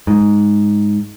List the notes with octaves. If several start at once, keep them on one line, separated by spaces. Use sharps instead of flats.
G#2